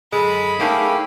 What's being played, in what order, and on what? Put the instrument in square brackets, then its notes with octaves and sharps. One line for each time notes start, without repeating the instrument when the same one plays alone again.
[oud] F#2 D3 [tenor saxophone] G#3 [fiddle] B5
[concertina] A3 G4 [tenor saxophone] A#3 [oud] C#4 D#4 G#4